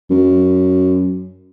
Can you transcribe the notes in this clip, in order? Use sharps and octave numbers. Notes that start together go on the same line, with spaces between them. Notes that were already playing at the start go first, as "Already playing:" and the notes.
F#2